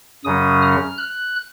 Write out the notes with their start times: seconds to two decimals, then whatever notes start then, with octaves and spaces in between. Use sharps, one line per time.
0.24 F#2 C#3 F#3 C#4 D#6
0.62 F6
0.98 F#6